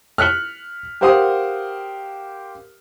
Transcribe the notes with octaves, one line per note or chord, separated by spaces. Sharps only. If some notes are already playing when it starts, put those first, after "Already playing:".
F6 F#6 B6 C#7 F#7
G4 A#4 C5 F5 F#5 D#6